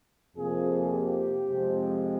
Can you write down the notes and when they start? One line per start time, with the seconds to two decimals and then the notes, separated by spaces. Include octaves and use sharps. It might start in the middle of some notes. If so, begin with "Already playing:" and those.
0.36 F2 C3 F3 A#3 G#4
0.92 G4
1.49 F2 C3 F3 G#3 C4